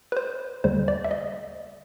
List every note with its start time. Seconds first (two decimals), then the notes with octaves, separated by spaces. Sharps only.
0.12 B4
0.17 C5
0.64 D#2 D3 G3 C5
0.88 D5
1.04 E5
1.11 D#5